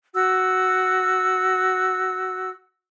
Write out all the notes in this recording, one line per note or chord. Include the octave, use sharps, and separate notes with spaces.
F#4 E6